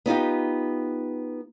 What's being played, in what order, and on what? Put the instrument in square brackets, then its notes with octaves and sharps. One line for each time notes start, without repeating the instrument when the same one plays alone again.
[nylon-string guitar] B3 D#4 F4 G4